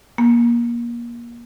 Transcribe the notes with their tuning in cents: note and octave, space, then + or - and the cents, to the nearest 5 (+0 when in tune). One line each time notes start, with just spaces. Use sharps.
A#3 +25